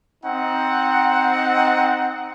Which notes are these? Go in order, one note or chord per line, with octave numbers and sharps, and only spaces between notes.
C4 D#4 F#5